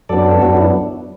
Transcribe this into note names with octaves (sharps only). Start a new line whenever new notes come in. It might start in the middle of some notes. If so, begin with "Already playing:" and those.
F#2 F#3 B3 D4 A4 D5
A4
F#2 F#3 B3 D4 F#4
E4